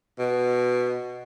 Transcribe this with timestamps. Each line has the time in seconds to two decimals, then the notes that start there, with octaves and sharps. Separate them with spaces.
0.19 B2